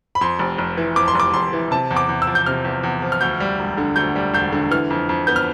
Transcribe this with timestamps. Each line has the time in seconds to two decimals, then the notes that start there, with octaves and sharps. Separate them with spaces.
0.15 B5
0.21 F2 C6
0.39 F1
0.58 F1
0.77 E3
0.96 F2 D6
1.08 C6
1.15 F1 D6
1.34 F1 C6
1.53 E3
1.71 C3 A5
1.91 E2
1.96 D6
2.09 E2
2.22 E6
2.27 F3
2.35 G6
2.46 C3 F6
2.64 E2
2.83 E2
3.02 F3
3.12 F6
3.21 D2 G6
3.40 G3
3.59 E1
3.78 D3
3.96 D2 G6
4.16 G3
4.33 E1 G6
4.52 D3
4.71 E3 F6
4.90 F2
5.09 F2
5.27 B3 G6
5.36 F6